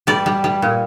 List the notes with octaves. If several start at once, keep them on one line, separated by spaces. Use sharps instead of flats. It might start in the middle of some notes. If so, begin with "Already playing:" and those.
G3 D5
G3
G3
A#2